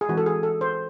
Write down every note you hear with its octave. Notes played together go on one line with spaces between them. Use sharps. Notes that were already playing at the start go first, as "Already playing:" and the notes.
G#4
E3 G#3 C4 F#4
A4
G#4
A4
C5